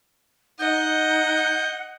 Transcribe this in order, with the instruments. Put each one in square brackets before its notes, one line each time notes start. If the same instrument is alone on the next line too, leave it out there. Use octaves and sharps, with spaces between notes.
[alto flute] D#4 [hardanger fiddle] D#5 [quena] F#5 [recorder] G6